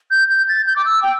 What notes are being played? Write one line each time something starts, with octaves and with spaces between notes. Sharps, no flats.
G6
G6
A6
G6
D6
E6
G5